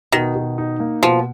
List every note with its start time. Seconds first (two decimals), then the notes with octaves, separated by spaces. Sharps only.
0.12 B2 D#3
0.35 B2
0.58 D#4
0.80 A#3
1.03 B2 F3